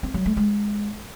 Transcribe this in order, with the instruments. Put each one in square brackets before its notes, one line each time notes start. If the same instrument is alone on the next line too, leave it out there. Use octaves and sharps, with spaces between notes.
[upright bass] C4
F#3
A3
G#3